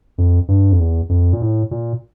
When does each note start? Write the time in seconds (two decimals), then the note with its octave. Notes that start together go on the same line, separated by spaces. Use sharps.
0.18 F2
0.48 G2
0.72 F2
0.80 E2
1.09 F2
1.33 A#2
1.41 A2
1.71 A#2